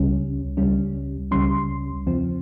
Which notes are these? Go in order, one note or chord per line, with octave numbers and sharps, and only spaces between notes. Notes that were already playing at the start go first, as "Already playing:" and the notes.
Already playing: C#2 C#3 G3 C#4
C#2 C#3 G3 C#4
C#2 C#3 G3 C#4 C6
E2 C#3 F3 C4